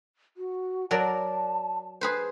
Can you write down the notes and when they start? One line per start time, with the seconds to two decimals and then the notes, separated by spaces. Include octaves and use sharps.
0.37 F#4
0.91 F#3 A#4 D5 A5
2.01 G#4 B4 C5